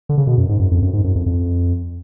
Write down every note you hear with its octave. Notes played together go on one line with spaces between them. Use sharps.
D3
C#3
B2
F#2
G#2
F#2
F2
F#2
G#2
F#2
F2
F2